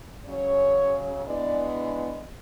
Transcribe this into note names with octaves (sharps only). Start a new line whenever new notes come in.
C#3 F#3 C#4 C#5
E3 G#3 B3 D4 D5